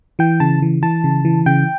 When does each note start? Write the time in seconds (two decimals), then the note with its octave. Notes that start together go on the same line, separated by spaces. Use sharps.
0.19 E3 G5
0.40 C#3 A5
0.62 E3
0.83 E3 A5
1.04 C#3
1.25 E3
1.46 C#3 G5